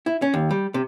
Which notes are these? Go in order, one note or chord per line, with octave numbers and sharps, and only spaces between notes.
E4
C#4
D#2
G3
C3